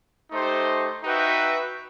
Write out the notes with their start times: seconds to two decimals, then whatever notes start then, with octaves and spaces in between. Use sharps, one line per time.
0.31 A3 D#4 G4 C5
1.04 D#4 F#4 B4 E5 G5